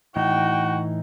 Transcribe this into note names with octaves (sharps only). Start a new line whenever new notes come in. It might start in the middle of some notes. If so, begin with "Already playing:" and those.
A2 E3 D#4 F#4 G5